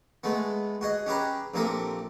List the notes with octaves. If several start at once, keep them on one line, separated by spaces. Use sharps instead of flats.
G#3 A3 B3
F#4 G#4 D#5
C#4 G4 G#4 B4 A#5
A#1 C3 A#3 A4 A#4 D#6